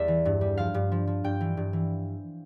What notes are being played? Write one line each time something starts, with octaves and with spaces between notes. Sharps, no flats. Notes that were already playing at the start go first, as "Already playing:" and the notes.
Already playing: E2 G3 D5 E5
E3
G2
G3
F3 F5
G2
F3
F3
G2 G5
E3
G2
E3